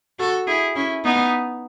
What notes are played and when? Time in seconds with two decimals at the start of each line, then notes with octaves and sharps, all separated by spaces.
0.19 F#4 A4
0.47 E4 G#4
0.76 C#4 E4
1.04 B3 D#4